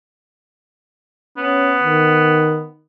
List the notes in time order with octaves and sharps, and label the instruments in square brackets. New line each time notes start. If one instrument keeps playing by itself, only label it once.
[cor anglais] B3 [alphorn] C#4
[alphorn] D#3